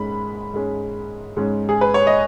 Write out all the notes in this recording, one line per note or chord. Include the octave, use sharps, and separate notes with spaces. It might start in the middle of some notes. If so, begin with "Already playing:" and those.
Already playing: G#2 G#3 C#4 B5
G#2 G#3 C#4
G#2 G#3 C#4
G#4
B4
C#5
D#5